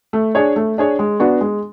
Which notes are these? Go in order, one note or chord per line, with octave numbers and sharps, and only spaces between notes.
A3
D4 G#4 C#5
A3
D4 G#4 C#5
G#3
B3 D4 F#4
G#3